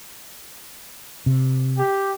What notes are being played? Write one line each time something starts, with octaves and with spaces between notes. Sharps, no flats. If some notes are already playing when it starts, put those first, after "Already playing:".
C3
G4